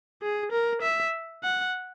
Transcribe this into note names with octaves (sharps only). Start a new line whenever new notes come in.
G#4
A#4
E5
F#5